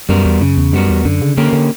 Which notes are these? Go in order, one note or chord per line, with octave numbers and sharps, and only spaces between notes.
F#2 G3 B3 F#4 A#4
E2
F#2 C#3
E2
F#2 G3 B3 F#4 A#4
E2
F#2 D3
C#3
D3 A#3 C#4 G4 A#4
D3